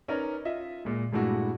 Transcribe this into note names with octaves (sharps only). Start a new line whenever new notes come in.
C#4 D#4 A#4 B4 D5
F4 D#5 E5
A#2 G#3
G2 A#2 G#3 A3 E4 F#4